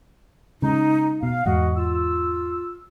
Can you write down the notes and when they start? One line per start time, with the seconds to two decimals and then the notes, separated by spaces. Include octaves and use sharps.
0.62 C#3 G#3 D#4
1.23 B2 F5
1.46 E2 G#2 F#4 D#5 F#5
1.76 F4 E6